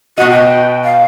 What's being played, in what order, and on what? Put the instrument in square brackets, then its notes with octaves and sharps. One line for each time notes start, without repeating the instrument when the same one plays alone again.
[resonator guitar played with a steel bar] B2 D#5 [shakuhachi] F#4
[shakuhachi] G5
F5